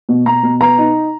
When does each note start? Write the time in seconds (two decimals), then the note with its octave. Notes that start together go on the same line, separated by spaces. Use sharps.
0.09 B2
0.26 B2 A#5
0.43 B2
0.61 B3 A#5
0.78 D#4